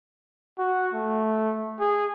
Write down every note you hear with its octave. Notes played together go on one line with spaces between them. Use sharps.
F#4
A3
G#4